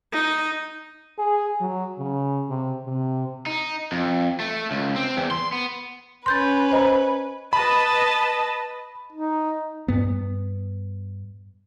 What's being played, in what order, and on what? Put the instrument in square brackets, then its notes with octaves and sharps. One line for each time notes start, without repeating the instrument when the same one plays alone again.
[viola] D#4
[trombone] G#4
F#3
C#3
C3
C3
[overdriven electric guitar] D#4
F2
A3
C#2
C4
E2
C6
B3
[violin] C#4 B4 [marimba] C6 G6 A6
[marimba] C5 D#5 A#5
[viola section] B4 D#5 A5 [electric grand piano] B5
[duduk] D#4
[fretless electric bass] G2 B3